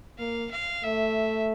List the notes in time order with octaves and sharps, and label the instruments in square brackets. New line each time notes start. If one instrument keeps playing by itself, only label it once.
[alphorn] A#3 [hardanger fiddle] F5
[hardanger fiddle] F5
[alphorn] A3 [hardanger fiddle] E5